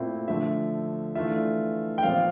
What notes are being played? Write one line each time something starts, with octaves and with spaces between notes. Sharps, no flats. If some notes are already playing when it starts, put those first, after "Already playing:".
Already playing: A#2 A3 C4 E4
D3 F3 A3 E5
E3 A3 D4 F4 E5
G5
A#2 F3 C4 F4 F5